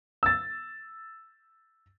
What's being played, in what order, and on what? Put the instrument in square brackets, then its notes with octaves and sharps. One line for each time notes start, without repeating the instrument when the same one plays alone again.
[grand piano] E6 A6